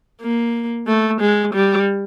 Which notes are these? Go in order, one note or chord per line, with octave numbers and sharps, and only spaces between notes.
A#3
A3
G#3
G3